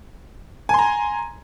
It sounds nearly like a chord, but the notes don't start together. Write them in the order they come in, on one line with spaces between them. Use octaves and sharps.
G#5 C6 A#5